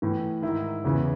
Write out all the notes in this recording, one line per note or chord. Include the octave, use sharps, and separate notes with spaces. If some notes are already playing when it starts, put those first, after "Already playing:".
A2 E3
G#2 D#3 E4
E2 C#3 E3